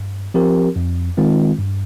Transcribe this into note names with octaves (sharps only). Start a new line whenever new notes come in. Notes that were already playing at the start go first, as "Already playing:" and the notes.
Already playing: G2
F3 C4 G4 A#4
F2
D#3 G#3 C4 F4
G2